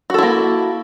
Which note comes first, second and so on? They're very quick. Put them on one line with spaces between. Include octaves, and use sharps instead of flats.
F#4 A4 E4 A#3